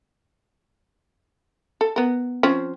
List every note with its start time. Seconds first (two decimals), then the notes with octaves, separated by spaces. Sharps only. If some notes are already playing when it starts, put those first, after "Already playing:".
1.81 A4
1.96 B3 A#4
2.43 F3 C4 C#4